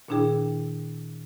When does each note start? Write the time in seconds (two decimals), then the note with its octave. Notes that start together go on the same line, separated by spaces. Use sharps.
0.08 A#2 D#3 D4 E4 G#4 G5